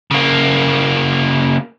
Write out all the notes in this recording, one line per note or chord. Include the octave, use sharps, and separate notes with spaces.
C#3 A#3